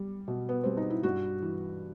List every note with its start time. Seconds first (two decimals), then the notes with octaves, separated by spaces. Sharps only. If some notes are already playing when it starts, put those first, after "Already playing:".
Already playing: G3
0.28 B2
0.49 B3
0.64 G3 C4
0.77 D#4
0.90 E4
1.03 G2 F#4
1.42 E3